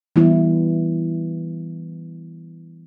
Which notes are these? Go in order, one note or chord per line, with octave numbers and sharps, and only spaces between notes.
E3 G3 B3 E4